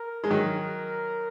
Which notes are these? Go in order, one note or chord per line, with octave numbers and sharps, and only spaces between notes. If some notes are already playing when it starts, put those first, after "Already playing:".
Already playing: A#4
G#3
D#3 F#3 A#4